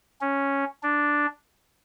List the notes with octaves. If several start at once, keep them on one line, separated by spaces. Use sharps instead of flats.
C#4
D4